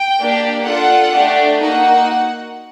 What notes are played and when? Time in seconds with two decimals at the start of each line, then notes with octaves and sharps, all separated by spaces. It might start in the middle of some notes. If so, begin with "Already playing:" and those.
Already playing: G5
0.20 A#3 D4 G4
0.66 D4 F4 A4 F#5
1.14 A3 D4 G4
1.61 A#3 D#4 F#4 F#5